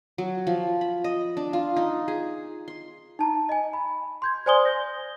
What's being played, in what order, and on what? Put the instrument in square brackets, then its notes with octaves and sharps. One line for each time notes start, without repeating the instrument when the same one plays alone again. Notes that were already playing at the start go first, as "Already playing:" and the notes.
[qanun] F#3
F3
B5
D#5
D4
F4
D#4
G#4
C6
[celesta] D#4 A5 A#5
D#5 G#5
B5
C6 G6 G#6
C5 D5 G#5 C6 D#6 G7
G6 A#6